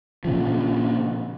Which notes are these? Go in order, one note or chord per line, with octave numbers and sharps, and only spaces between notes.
A#2 C#3 F3